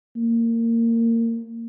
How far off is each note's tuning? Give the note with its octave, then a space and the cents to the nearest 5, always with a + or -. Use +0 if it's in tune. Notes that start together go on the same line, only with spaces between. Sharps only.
A#3 -20